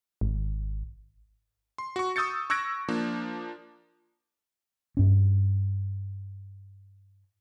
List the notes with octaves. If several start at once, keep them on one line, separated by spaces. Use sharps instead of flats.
G#1
C6
F#4 C#6
C#6 D#6 E6 G6 A6 C#7
C#6 E6 F#6 G#6 A#6 D7
F3 A#3 D4
G2 C#4